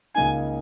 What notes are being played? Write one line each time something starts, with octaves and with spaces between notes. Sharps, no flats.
C#2 C#3 A#3 D#4 G#5